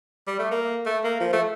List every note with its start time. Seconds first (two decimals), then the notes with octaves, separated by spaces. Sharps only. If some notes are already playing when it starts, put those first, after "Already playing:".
0.27 G3
0.39 A3
0.51 A#3
0.86 A3
1.04 A#3
1.20 F3
1.33 A3